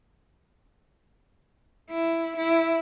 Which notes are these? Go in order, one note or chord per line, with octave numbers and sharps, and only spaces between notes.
E4
E4